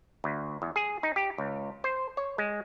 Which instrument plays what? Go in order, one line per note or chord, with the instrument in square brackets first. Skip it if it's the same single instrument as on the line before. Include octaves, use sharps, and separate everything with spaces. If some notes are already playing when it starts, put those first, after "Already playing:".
[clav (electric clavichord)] D2
E2
G#4
D#4
G4
C#2
C5
C#5
G#3